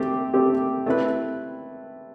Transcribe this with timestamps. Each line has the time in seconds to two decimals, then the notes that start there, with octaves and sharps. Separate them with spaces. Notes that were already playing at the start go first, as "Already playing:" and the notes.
Already playing: A3 C4 G4
0.34 A3 C4 G4
0.86 A3 C4 E4 B4